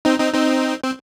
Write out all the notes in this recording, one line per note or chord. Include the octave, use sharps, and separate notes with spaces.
C4 D#4
C4 D#4
C4 D#4
C4